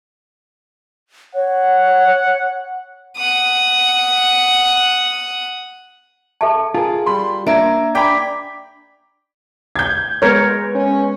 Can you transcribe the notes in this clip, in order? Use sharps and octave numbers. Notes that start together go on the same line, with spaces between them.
C#5 F#5
F#5 D#6
A4 E5 A5 C#6
F4 G#4 A#4 A5
G3 B5 C6
A#3 D4 E5 A#5 G#6 D7
D4 D5 G5 A#5 B5 D6 B6
G6 G#6
G#3 B3 A#4 C#5
C#4